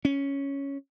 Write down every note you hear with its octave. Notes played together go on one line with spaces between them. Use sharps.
C#4